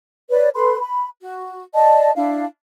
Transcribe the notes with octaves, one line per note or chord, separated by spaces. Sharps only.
B4 C#5 D5
A4 B4 B5 C6
B5
F#4
D5 D#5 A5
D4 E4 F5